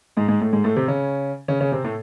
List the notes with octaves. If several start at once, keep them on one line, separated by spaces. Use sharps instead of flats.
G#2 G#3
G#2 G#3
A2 A3
G#2 G#3
A2 A3
C3 C4
C#3 C#4
C#3 C#4
C#3 C#4
C3 C4
A2 A3